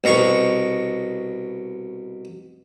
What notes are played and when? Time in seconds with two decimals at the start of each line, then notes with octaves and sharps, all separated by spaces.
0.04 C2 B2 A#5 C#6